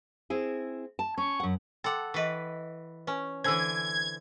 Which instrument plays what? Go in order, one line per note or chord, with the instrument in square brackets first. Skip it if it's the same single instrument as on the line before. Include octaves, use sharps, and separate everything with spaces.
[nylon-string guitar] C4 E4 G#4
A5
[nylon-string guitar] C#4 [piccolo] C#6
[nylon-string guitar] F#2 F#5
[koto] A4 F#5 [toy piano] G5 C6 D6
[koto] E3 B4 [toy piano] D#5 C#6
[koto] C#4 [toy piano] B4 G#5
[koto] D3 E3 [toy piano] C5 G#5 E6 [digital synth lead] G#6